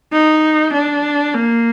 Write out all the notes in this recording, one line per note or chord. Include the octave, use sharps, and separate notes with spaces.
D#4
D4
A#3